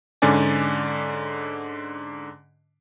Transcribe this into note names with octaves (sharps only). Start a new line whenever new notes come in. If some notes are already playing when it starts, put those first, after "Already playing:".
G#2 D3 C#4 D5 G#5